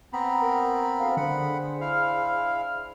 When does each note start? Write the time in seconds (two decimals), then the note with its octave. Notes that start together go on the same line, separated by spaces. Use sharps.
0.13 B3 C4 A#5 B5
0.42 A#4
1.00 D2 F5
1.17 D3 D4 G#4 C5 F#5 B5
1.81 E4 F5 F6